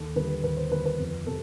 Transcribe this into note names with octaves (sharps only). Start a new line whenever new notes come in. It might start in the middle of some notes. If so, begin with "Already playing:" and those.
Already playing: D#2 A4
D3 G3 B4
D#2 B4
C5
D3 G3 B4
B4
F2
C3 A4